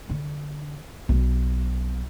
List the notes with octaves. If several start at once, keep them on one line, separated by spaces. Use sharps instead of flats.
D3
B1